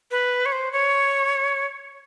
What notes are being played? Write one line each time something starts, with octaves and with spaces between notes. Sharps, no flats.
B4
C#5
C5
C#5